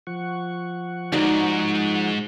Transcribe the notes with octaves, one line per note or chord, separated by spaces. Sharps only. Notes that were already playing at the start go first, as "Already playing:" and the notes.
F3 F#5 C#6
C#2 G#2 D#4 F#4 D5